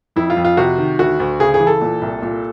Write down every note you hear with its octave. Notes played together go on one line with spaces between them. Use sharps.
F2 E4
F4
F2
F4
C3 F#4
D#3
D2 F#4
D2
C#3 G#4
G#4
E3
A4
A#2
C2
A#2